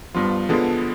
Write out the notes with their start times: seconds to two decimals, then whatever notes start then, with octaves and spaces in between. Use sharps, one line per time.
0.15 G2 F3 B3 F4
0.49 D3 F3 G#3 B3 D4